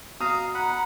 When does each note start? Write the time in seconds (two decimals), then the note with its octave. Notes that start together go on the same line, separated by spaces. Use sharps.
0.21 B2 F5 A#5 D#6
0.54 F#5 A#5 B5